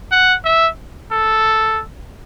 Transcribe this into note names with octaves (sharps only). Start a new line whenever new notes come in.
F#5
E5
A4